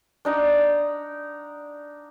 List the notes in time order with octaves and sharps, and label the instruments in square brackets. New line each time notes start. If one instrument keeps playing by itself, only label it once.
[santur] D4 D#4 F#5